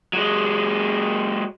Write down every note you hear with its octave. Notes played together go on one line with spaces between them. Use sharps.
F#3 G#3